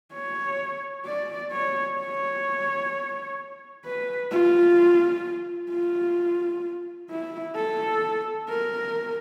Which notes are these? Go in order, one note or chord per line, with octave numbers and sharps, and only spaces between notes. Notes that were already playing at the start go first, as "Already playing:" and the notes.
C#5
D5
C#5
C#5
B4
F4
F4
E4
A4
A#4